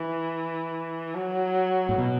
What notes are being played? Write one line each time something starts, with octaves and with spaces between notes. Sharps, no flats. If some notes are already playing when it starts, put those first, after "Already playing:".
Already playing: E3
F#3
A2
B2